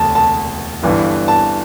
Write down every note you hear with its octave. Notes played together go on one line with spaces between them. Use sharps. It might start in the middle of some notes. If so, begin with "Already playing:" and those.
Already playing: E1 D2 C3 A5
A5
G1 G2 E3
A5